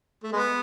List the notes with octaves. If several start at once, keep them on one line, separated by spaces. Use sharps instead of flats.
A3
G#3 B3